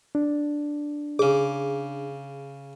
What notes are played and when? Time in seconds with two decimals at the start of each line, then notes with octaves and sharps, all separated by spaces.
0.15 D4
1.19 C#3 G#4 D6